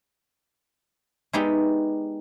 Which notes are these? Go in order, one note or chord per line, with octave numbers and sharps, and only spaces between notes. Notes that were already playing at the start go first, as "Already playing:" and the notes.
G#3 B3 D#4 G4 D5 E5